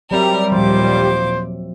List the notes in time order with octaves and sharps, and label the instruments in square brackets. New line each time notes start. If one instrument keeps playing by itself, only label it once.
[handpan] F#3 C4 E5 [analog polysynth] G3 [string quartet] A#4
[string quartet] D#2 A#2 D6 [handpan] F3 [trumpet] C5